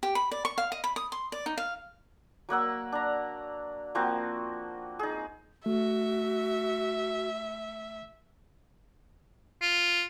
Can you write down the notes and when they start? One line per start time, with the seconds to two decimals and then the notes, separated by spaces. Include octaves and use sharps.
0.03 G4
0.15 B5
0.32 D5
0.45 C#6
0.58 F5
0.72 D#5
0.84 B5
0.96 D#6
1.12 C6
1.32 D5
1.46 D#4
1.58 F5
2.49 F#3 A#3 F#5 E6
2.92 D4 A#5
3.95 F3 A#3 C4 F#4
4.99 D#4 G#4
5.66 A3 F#4 E5
9.62 F4